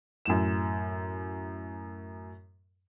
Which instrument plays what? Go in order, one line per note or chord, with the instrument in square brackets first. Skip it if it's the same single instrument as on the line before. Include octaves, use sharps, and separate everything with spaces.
[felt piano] F#2 A2 E7